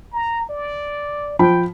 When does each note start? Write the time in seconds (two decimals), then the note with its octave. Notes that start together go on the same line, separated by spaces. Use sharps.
0.13 A#5
0.49 D5
1.39 F3 G5 B5